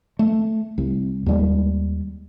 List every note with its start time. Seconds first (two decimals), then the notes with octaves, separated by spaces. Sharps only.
0.19 A3
0.78 C2
1.26 D#2 G3 G#3